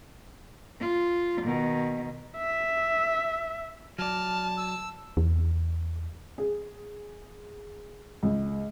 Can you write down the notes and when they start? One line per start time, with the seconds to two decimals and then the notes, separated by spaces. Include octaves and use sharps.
0.81 F4
1.41 B2 D#3
2.37 E5
3.99 F#3 D5 A5 F6
4.57 E6
5.17 E2
6.38 G#4
8.23 C#2